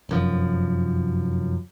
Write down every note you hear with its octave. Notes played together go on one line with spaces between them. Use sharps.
F1 F#2 F3